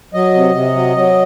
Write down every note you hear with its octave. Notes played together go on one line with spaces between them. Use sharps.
F#3 D#5
C3
C3
F#3
F#3